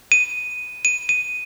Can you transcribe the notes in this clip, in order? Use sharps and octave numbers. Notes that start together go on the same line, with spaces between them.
D#7
D#7
D#7